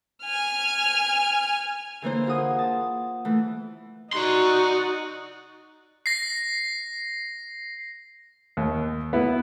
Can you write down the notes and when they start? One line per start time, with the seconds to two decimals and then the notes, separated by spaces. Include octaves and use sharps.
0.24 G#5 F6
2.02 D3 E3 A#3 C5
2.27 F4 G#4 A#4 F#5 D#6
2.59 A5
3.25 E3 A3
4.13 D#4 F#4 D5 C6
6.06 A#6 C7
8.57 D#2
9.13 B3 E4